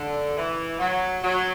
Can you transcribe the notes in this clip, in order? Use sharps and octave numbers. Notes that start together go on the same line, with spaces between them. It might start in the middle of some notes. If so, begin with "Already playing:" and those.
Already playing: D3
E3
F#3
F#3